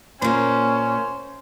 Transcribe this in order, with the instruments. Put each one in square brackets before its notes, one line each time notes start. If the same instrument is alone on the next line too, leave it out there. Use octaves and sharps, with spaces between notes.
[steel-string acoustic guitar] A#2 A#3 [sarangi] C#4 [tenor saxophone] C5